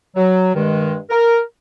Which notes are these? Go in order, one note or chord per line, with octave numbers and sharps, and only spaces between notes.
F#3
G2 D#3 G#3
A#4